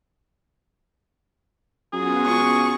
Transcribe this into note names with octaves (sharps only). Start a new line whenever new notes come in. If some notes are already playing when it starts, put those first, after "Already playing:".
F#2 B3 F4 F#4 G#4
C#2 C#6